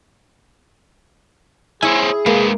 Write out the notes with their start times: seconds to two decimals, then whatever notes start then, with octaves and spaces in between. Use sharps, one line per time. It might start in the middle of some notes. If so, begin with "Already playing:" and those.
1.82 E4 G#4 C5 C#5 G#5
2.26 G#3 A#3 B4